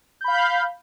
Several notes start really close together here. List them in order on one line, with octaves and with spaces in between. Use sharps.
G6 B5 F5